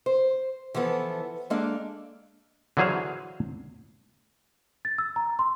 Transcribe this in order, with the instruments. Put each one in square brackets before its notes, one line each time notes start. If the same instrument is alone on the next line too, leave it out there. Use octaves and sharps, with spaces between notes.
[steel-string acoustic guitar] C5
E3 F3 B3 A4
G#3 A#3 D4 A4 F5
[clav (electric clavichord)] D3 E3 F#3 G#4 C5 F5
[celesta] A6
E6
A#5
C6